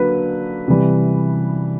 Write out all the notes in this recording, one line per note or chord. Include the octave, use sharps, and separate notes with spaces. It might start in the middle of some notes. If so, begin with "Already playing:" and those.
Already playing: D3 F#3 A#3 B4
C3 E3 G3